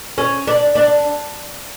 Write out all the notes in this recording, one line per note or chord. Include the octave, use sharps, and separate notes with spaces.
C#4
D4
D4